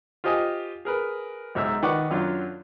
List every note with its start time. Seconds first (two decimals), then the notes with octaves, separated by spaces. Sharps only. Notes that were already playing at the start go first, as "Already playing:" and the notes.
0.24 F4 G4 C5 D#5 G#5 D#6
0.85 G#4 A#4 B4
1.55 B1 G#2 E5 A#5 E6
1.83 D#3 B4 D5 F#5 C#6 D6
2.11 F#2 F#3 D4 F4